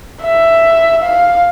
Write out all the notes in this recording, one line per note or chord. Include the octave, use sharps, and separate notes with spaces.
E5
F5